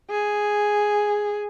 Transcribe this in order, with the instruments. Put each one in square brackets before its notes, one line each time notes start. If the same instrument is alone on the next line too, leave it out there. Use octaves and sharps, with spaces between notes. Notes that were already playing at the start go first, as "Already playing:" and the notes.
[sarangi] G#4